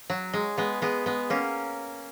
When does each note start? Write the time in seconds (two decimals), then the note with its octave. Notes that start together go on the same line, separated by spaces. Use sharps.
0.10 F#3
0.34 G#3
0.58 G#3 B3
0.82 G#3 B3
1.06 G#3 B3
1.30 A#3 C#4